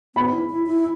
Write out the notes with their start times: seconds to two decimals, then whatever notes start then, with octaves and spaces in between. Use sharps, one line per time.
0.16 B3 B5
0.32 E4
0.50 E4
0.67 E4